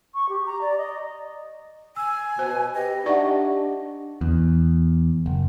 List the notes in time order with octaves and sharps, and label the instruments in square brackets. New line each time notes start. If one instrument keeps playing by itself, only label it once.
[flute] C#6
G4
A#5
D5
D#5
[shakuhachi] G#5 [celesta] E6
[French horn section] B2 [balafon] C5
[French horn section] G4 B4 [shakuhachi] D#5
[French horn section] D4 [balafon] D#4 D5 C#6 [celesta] G4 E5 F#5
[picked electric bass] E2
F#1